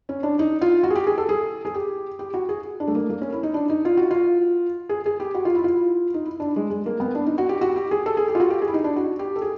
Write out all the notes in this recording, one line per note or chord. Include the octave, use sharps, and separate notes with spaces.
C#4
D4
D#4
F4
F#4
G#4
G4
G#4
A4
G#4
G#4
G4
G4
F#4
G#4
D4
A3
A#3
A#3
C#4
E4
D#4
D4
D#4
F4
F#4
F4
G#4
G#4
G4
F#4
F4
E4
F4
D#4
E4
D4
G#3
G#3
A#3
B3
D4
D#4
F#4
G4
F#4
G4
G#4
A4
G#4
G4
F4
F#4
G4
G#4
E4
D#4
D4
F#4
G4
A4
G#4